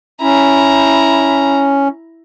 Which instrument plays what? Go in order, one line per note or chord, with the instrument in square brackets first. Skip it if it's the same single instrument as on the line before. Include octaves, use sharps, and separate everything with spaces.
[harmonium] C#4 [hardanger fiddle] E4 A#5